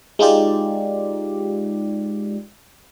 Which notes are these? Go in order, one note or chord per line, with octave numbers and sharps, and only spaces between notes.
G#3 D#4 F4 G4 D5